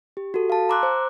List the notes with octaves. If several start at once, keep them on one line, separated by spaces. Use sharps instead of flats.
G4
F#4 A4
F5 A5
A#5 C6 D6 E6 F#6
C5